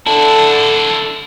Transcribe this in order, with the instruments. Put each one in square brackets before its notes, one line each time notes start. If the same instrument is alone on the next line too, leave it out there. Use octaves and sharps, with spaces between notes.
[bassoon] D3 [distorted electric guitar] D4 E4 [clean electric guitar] A4